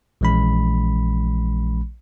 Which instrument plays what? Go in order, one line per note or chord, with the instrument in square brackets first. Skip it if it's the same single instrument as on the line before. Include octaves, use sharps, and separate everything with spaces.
[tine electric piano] A#1 E3 G#3 C#4 B5